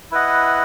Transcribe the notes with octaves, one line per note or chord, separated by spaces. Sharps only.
E4 B4 D#5 F#5